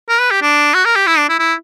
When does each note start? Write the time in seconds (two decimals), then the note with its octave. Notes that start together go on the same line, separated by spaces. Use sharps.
0.09 A#4
0.20 B4
0.31 G4
0.42 D4
0.74 F#4
0.85 A#4
0.96 G4
1.07 E4
1.18 D4
1.29 E4
1.39 E4